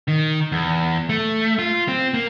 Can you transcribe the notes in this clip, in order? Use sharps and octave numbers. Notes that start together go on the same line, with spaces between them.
D#3
E2
A3
F4
C4
A#3